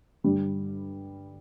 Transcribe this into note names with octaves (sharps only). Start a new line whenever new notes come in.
G2 D3 G3